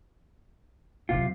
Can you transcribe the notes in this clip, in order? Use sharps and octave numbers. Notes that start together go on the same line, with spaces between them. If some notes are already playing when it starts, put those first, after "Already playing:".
F2 C3 F#3 F4